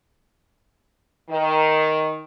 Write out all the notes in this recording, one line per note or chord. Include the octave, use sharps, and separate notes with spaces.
D#3